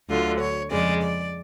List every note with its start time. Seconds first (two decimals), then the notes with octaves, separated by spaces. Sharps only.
0.09 D2 D3 F#3 F4
0.40 C#5
0.71 F2 C#3 G#3 D5
1.02 D5